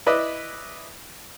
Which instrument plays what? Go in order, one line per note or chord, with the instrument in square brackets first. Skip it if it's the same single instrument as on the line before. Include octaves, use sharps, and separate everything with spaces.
[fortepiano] E4 B4 D5 D#5